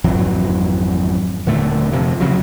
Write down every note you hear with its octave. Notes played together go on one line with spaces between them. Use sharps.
G#1 F2 E3 F#3
D#1 A#2 D3 A3
F2 C3 F3
C2 C#3 F#3